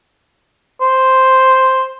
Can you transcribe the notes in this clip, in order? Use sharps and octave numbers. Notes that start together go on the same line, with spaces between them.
C5